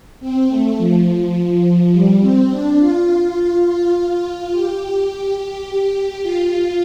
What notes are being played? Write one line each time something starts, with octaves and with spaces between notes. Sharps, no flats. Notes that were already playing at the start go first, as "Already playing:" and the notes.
C4
A3
F3
G3
C4
D4
F4
F4
F4
F4
G4
F4